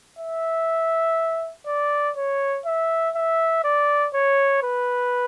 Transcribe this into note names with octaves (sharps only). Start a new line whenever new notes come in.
E5
D5
C#5
E5
E5
D5
C#5
B4